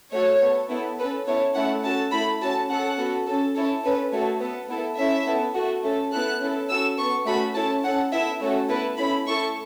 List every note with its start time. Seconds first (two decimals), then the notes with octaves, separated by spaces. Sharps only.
0.12 A3 F#4 A4 C#5
0.41 B3 A4
0.69 B3 E4 A4
0.98 C#4 A4 B4
1.26 B3 E4 A4 C#5
1.55 A3 C#4 E4 A4 F#5
1.83 C#4 F#4 A4 A5
2.12 A3 E4 A4 B5
2.41 C#4 F#4 A4 A5
2.69 C#4 A4 F#5
2.98 B3 F#4 A4
3.27 C#4 A4
3.55 C#4 E4 A4 C#5
3.84 C#4 A4 B4
4.12 A3 F#4 A4 C#5
4.41 B3 A4
4.69 B3 E4 A4
4.98 C#4 E4 A4 E5
5.26 B3 E4 A4
5.55 A3 F#4 A4
5.83 A3 C#4 A4
6.12 B3 E4 A4 F#6
6.40 C#4 E4 A4
6.69 C#4 F#4 A4 E6
6.98 B3 A4 C#6
7.26 A3 C#4 F#4 A4 B5
7.55 C#4 E4 A4 A5
7.83 C#4 A4 F#5
8.12 B3 E4 A4 E5
8.40 A3 C#4 F#4 A4 C#5
8.69 B3 E4 A4 B4
8.97 C#4 E4 A4 B5
9.26 A3 E4 A4 C#6